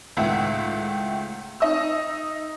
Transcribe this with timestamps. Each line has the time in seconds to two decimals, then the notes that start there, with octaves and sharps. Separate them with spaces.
0.17 C#2 A2 D#3 E5 F#5
1.60 D#4 D#5 E6